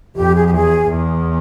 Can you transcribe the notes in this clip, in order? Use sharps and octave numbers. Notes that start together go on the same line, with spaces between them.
F2 G4
G#4
G4
E2 G#4
E2